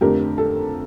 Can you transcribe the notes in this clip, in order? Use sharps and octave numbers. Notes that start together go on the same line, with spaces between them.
F2 D3 A3 G4 A#4
A4